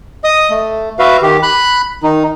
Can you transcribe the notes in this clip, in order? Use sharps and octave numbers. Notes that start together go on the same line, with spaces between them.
D#5 D#6
A3
F#4 B4 E5 F5
D#3 G4
B5 F#6
D#3 D#4